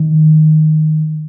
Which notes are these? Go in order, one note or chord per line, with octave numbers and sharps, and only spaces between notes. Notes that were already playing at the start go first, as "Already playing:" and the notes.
Already playing: D#3